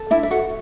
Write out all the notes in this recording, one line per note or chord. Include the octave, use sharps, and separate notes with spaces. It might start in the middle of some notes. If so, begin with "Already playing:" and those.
Already playing: A4
D4 E4 E5
E5
F#4 A4 F#5